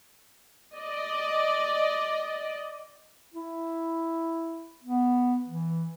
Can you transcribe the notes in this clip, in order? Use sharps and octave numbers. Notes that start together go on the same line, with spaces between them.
D5 D#5
E4
B3
E3